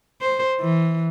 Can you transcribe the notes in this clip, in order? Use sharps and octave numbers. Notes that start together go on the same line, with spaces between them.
C5
E3